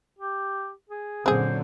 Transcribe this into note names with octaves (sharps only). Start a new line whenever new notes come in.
G4
G#4
F#2 A#2 D3 C4 G#4 C5